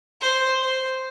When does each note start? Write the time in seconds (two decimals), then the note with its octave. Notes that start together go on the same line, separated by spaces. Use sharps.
0.21 C5
0.61 C5